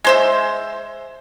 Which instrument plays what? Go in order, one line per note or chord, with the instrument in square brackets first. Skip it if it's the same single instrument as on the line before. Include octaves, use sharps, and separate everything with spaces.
[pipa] G#3 C5 E5